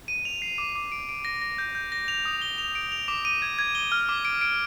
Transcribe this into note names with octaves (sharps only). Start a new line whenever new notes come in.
D#7
F7
C7
D6
D6
D7
D7
A#6
A#6
G6
G6
A#6
F7
D#6
G7
F7
D7
F7
D6
D#7
G#6
G#6
G7
F6
D6
D7
D7